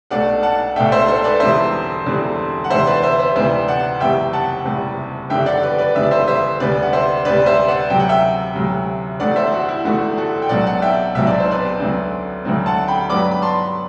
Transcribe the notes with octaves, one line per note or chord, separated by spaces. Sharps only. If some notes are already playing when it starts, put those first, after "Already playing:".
B1 B2 A3 D4 D5 F#5
F#5 A5
B1 B2 A3 D4 E5 G5
C5 E5
A4 C5
B4 D5
E1 E2 D3 G3 C4 C5 E5
E1 E2 D3 G3 C4
F#5
D2 C3 E3 B3 D4 C5 E5
B4 D5
C5 E5
C5 E5
D2 C3 E3 B3 D4 C5 E5
D5 F#5
F#1 E2 C3 G3 E5 G5
F#5 A5
F#1 E2 C3 G3
F#1 E2 D3 G3 E5 G5
D5 F#5
B4 D5
B4 D5
F#1 E2 D3 G3 E5
D5
C5 E5
C5 E5
D2 C3 G3 B3 D4 B4 D5
F#5
C5 E5
D2 C3 G3 B3 D4 B4 D5
C5 E5
D5 F#5
D2 C3 F#3 G5
F#5
E5 G5
D2 C3 F#3
E2 D3 A3 D5 F#5
C5 E5
F#4
E4
E2 D3 A3 F#4
F#4 A4
G5
B1 B2 F#3 C4 D5 F#5
D5 F#5
E5 G5
B1 B2 F#3 C4 E5
D5
C5
B4 D5
D2 D3 F#3 C4
D2 D3 F#3 C4
F#5 A5
G5 B5
G2 F#3 B3 D4 B5 D6
B5
A5 C6